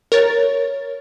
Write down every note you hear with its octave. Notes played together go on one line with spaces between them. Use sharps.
A#4 C#5 A6